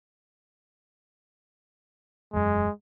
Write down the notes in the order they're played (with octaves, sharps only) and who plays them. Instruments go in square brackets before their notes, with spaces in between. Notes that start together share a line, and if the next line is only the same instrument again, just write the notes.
[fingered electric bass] E1 F#2 [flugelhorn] G#3